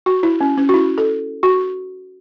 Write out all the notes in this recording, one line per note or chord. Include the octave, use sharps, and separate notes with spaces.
F#4
E4
C#4
C#4
F#4
E4
A4
F#4